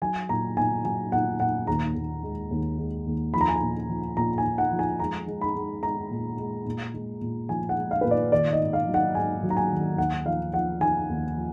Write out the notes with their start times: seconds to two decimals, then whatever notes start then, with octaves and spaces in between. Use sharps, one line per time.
0.02 F#3 G#5
0.29 A#2 A#5
0.57 A#2 G#5
0.84 F#3 G#5
1.12 A#2 F#5
1.40 A#2 F#5
1.67 D#2 A#5
1.95 D#2
2.23 G#3
2.51 D#2
2.78 G#3
3.06 D#2
3.34 F3 B5
3.41 A#5
3.48 G#5
3.56 A#5
3.61 A#2
3.89 F3
4.17 A#2 A#5
4.38 G#5
4.44 A#2
4.58 F#5
4.72 F3
4.79 G#5
5.00 G#3 A#5
5.27 G#3
5.41 B5
5.56 G#3
5.83 G#3 A#5
6.10 A#2
6.38 G#3
6.66 A#2
6.94 G#3
7.21 A#2
7.49 F3 G#5
7.69 F#5
7.77 G#3
7.91 F5
8.01 A#2 B4
8.11 D5
8.32 D#3 D5
8.52 D#5
8.59 G#2
8.73 F5
8.87 F#3
8.94 F#5
9.15 G#2 G#5
9.43 F#3
9.50 A#5
9.57 G#5
9.71 D#3
9.98 D#2 F#5
10.26 F3 F5
10.53 F3 F#5
10.81 F3 G#5
11.09 D#2
11.36 F3